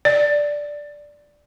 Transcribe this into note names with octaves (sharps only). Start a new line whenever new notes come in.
D5